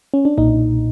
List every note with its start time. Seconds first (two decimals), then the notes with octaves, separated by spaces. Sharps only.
0.14 C#4
0.25 D4
0.38 B1 A#2 D#4